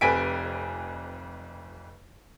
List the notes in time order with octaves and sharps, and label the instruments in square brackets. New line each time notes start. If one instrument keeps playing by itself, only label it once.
[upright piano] F1 F2 B4 G#5 B6 D7